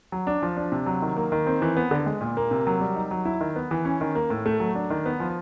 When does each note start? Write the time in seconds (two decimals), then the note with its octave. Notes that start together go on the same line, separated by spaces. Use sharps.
0.12 F#3
0.27 D4
0.42 F3
0.57 D4
0.72 C3
0.86 F#3
1.02 D#3
1.17 A#3
1.32 D#3
1.47 C4
1.62 E3
1.77 B3
1.91 D3
2.06 G#3
2.21 A#2
2.37 A#3
2.51 C3
2.67 F#3
2.81 G3
2.96 D#4
3.11 F#3
3.25 E4
3.41 D#3
3.56 B3
3.71 E3
3.85 C#4
4.01 D#3
4.15 A#3
4.30 A2
4.46 A3
4.60 F#3
4.75 D4
4.90 D#3
5.06 B3
5.20 F3